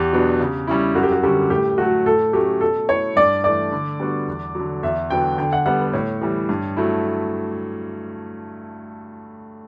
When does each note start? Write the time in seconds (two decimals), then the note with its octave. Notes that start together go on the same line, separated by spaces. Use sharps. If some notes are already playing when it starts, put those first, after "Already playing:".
Already playing: E2 G4
0.12 B2 F#3 B3 D4
0.40 C#3
0.67 G3 C#4 E4
0.95 F#2 F#4
1.03 G4
1.12 F#4
1.23 D3 G3 C#4 F#4 G4
1.50 A2 G4
1.78 F#3 A3 F#4
2.06 A2 A4
2.33 F#3 A3 C#4 G4
2.61 B2 A4
2.89 A3 E4 C#5
3.16 G2 D5
3.44 E3 A3 D4 D5
3.72 D3
4.00 G3 B3 D4 F#4
4.28 E2
4.55 D3 F#3
4.83 E2 E5
5.10 D3 F#3 B3 G5
5.38 D3 G5
5.53 F#5
5.66 G3 B3 F#5
5.80 B4
5.93 A2 C#5
6.21 E3 G3
6.49 G2
6.77 F#3 A3 E4